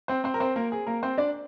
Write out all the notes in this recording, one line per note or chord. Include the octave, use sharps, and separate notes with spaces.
C4 C5
C4 C5
A#4
C4 C5
A#3 A#4
G#4
A#3 A#4
C4 C5
D4 D5